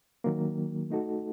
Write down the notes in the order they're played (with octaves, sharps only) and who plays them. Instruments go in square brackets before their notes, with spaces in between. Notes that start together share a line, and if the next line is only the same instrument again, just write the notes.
[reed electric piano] D#3 F#3 A#3
A3 D#4 F#4 A4